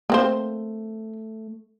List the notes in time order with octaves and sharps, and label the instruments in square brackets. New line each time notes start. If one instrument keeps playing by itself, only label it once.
[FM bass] A3 [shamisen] A#3 C4 C5